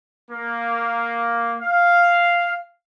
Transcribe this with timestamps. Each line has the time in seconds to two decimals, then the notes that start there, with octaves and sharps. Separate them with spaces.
0.30 A#3
1.61 F5